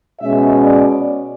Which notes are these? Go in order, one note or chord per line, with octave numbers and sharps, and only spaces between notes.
B2 G#3 C#4 E5
D5